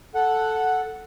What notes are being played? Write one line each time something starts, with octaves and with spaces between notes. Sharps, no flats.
A4 F#5